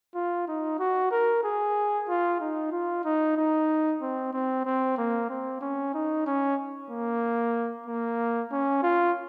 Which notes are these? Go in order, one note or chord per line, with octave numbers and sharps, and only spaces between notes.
F4
D#4
F#4
A#4
G#4
F4
D#4
F4
D#4
D#4
C4
C4
C4
A#3
C4
C#4
D#4
C#4
A#3
A#3
C#4
F4